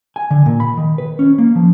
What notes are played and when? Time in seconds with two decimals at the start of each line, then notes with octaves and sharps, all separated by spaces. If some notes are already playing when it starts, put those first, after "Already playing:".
0.16 G#5
0.31 D3
0.46 A#2
0.60 B5
0.77 D#3
0.98 B4
1.19 C#4
1.38 A#3
1.55 F3